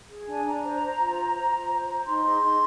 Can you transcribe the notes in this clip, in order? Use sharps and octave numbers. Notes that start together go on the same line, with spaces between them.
G#4
D4 G#5
D4 A#5
C5
C5
F4
C5
C5
F4
C5
C5
D#4 C6
G#4
D#4